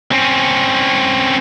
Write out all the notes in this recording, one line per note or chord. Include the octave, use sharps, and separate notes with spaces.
C4 C#4